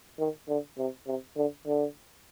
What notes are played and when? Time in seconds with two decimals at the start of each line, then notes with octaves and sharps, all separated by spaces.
0.19 D#3
0.48 D3
0.78 C3
1.07 C3
1.37 D3
1.66 D3